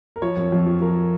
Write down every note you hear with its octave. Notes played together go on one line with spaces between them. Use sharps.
A#4
F3 C#5
F2
F2
F3
F3 A#4